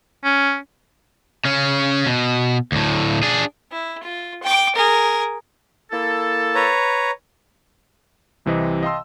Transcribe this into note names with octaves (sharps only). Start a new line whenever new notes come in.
C#4
C#3 C#4
B2
D2 A2
D4 G#4
E4
F4
G5 D6
G#4 A#4
A#3 E4 A4
B4 C#5 A#5
C2 C3 E3 C4 D#5
D#5 F5 G5 A5 C6 E6